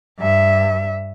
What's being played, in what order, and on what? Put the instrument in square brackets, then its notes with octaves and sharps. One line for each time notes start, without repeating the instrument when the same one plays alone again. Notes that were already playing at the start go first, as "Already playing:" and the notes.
[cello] G2 E5